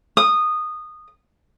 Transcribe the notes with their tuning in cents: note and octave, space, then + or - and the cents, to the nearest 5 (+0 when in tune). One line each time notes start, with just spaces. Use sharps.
D#6 -15